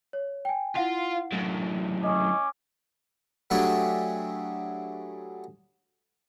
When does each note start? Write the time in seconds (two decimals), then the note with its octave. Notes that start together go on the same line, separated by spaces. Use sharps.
0.13 C#5
0.45 G5 G#5
0.76 E4 F4 F5 F#5
1.33 F#2 A2
2.03 C#4 D#5 D6 D#6
3.50 F#3 A3 D4 E4 G4 G#4